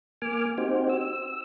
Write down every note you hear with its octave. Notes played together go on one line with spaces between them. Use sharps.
A#3 G#5 D6 F6
C4 D#4 F#4 G4 C5
E6